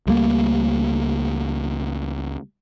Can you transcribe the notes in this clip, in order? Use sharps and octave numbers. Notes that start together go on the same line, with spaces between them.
C#2 G3 A3 A#3